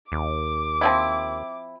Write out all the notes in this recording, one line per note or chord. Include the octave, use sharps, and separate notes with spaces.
D#2 D6
F3 C4 E4